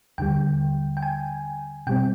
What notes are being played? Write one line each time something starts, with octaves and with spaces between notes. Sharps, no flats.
D#2 D3 G3 G5
G5
G#5
B2 G3 C4 G5